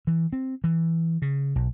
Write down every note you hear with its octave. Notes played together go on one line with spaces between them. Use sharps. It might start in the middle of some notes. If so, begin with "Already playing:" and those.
E3
C4
E3
C#3
B1